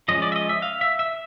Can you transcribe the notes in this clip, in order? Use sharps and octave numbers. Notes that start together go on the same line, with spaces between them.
F3 G#3 C#4 D#5
D5
E5
D#5
E5
F5
E5
E5